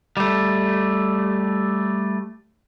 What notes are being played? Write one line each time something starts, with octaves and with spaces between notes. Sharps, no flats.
G3 A3